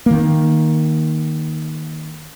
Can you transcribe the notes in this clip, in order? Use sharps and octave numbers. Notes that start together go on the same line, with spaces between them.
D#3 A#3